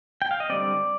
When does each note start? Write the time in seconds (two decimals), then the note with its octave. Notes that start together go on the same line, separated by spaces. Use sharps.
0.22 G5
0.31 F5
0.40 D#5
0.49 D3 G3 C4 D5